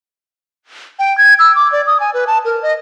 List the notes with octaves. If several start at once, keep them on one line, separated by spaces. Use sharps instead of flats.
G5
G#6
E6
D6
D5
D#6
G#5
B4
A5
A#4
D#5